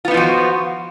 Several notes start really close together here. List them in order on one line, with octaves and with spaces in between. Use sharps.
F4 B3 D#4 F3 F#4